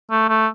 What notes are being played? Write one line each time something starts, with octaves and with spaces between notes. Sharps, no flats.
A3
A3